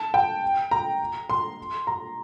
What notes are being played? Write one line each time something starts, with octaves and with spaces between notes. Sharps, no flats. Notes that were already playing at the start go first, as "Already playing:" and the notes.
Already playing: A5
G5
A#5
C6
A#5